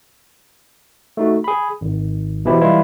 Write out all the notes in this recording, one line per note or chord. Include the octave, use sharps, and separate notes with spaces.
A3 D#4 F#4
G#4 B5
G#1
B2 E3 F3 E4 G4
E3 G3 G#3 E4 F4